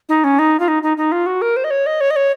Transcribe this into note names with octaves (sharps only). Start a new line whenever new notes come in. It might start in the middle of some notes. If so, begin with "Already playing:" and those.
D#4
C#4
D#4
F4
D#4
D#4
D#4
F4
F#4
A#4
C5
D#5
C#5
D#5
C#5
D#5
C#5